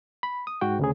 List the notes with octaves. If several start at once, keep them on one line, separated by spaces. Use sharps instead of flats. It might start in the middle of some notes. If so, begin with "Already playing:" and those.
B5
D#6
G#2 F#4 G5
D2 C#3 G#4